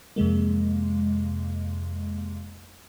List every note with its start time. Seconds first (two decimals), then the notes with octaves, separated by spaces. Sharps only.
0.16 F2 C3 G#3 A#3